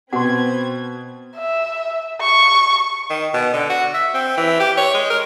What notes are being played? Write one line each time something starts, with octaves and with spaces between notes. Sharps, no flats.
B2 C4 B4 F#5 C6 G#6
E5
C#6
D#3
B2
D3
F#4
E5
C4
E3
G4
C#5
G#3
A#4